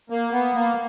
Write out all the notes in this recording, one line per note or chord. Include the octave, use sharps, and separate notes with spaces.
A#3
B3
A#3